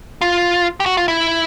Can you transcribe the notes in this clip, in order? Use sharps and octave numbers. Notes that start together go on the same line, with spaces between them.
F4
G4
F#4
F4
E4